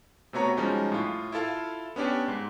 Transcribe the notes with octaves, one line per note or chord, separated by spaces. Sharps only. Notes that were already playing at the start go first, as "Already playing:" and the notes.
C3 A3 B3 F#4 C#5 A#5
F3 G3 G#3 C#4 D#4 F#4
A2 F4
E4 F4 A4 F5
B3 C#4 D4 G4
G#2